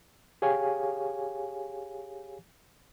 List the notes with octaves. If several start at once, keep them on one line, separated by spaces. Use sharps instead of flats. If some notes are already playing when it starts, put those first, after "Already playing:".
G4 G#4 C#5 F5 G#5